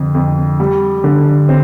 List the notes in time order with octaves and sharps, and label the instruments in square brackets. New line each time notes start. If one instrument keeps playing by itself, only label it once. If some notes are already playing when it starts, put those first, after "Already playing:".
Already playing: [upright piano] F2 D3
F2
G3
D3
C4